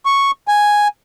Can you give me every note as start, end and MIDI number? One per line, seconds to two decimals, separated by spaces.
0.06 0.31 85
0.48 0.88 80